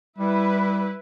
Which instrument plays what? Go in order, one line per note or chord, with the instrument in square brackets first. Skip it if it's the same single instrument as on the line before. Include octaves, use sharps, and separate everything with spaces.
[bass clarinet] G3 [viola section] E4 B4